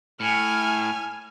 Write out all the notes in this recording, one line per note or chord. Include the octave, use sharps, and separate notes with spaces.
A2 G#5 F6